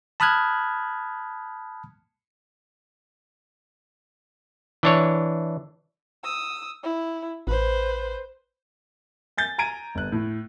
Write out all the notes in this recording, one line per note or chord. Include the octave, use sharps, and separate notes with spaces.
A5 B5 D#6 F6 F#6 G#6
E3 D4 C#5
D#6 E6
E4
A1 B4 C5
G#5 G6 A6
G#5 A#5 G#6 D7 D#7
G1 F#6
A2